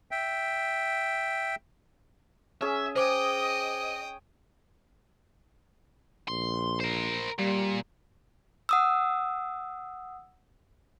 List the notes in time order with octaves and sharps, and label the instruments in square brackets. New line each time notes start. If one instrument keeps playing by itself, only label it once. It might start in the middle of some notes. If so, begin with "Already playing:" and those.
[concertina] E5 G5
[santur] C#4 G#4 [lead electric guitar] E5
[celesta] C5 D6 [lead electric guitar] D#5 [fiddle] G5 D#6
[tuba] A#1 [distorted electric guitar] C6
[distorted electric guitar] A#4 C5
[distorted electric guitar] A#2 [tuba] G3
[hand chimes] F#5 D#6 E6